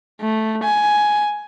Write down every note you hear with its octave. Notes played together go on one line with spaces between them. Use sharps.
A3
G#5